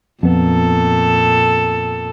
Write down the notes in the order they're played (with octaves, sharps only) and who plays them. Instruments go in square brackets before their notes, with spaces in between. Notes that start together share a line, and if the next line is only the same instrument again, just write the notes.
[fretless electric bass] F2 B3 [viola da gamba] A#2 A4